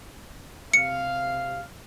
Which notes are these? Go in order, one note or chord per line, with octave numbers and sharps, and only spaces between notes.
C3 F5 C#7